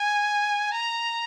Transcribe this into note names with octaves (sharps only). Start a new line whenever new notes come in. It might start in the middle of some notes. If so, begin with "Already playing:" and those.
Already playing: G#5
A#5